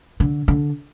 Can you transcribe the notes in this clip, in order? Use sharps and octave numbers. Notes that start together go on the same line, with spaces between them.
D3
D3